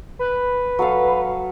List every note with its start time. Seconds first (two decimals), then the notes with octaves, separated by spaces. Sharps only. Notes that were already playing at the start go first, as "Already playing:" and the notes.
0.19 B4
0.79 F#3 A4 F5